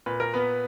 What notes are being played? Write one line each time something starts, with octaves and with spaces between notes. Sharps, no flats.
A#2 B4
A#4
B3 B4